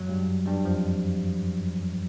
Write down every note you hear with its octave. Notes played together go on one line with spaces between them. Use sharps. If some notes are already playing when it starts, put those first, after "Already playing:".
Already playing: F#2 F#3
G2 G3
G2 G3
F2 F3